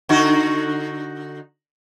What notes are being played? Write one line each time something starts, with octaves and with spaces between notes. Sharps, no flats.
D3 D#4 F#4